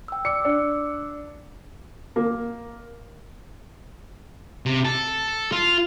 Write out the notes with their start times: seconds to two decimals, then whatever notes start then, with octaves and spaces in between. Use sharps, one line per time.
0.08 G5 E6
0.25 D5 D6 E6 C#7
0.45 D4
2.16 A#3
4.66 C3
4.85 A4
5.52 F4